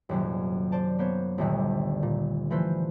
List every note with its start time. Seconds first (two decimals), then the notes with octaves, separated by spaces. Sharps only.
0.09 D#1 F#2 C3 F#3
0.72 C5 D5 A5
0.99 A#3 B3 C5 C#5
1.38 G1 D2 A#2 D3 D#3 G3
2.03 A#2
2.50 E3 F3 A3 B4 C5